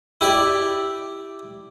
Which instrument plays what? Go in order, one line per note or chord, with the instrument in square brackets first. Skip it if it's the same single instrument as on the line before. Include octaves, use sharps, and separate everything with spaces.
[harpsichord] E4 G4 D5